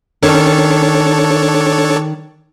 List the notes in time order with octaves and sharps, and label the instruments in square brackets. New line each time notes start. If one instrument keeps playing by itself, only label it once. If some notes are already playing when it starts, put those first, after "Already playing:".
[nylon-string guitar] D#3 C#4 [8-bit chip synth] D4 A4 C#5